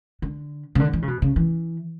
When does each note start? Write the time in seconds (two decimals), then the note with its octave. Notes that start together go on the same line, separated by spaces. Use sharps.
0.22 D3
0.75 C#3
0.80 D3
0.93 E3
1.02 C#3
1.08 B2
1.22 C#3
1.36 E3